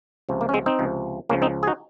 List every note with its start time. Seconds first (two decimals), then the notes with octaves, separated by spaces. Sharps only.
0.29 C#2 C3 F3
0.41 A#3
0.49 C#4
0.54 G#3 C4
0.66 C4 D#4
0.79 C#2 C3 F3
1.29 C#2 C#3 F3 A#3 C#4
1.42 C4 D#4
1.63 G#4
1.67 D#4 F#4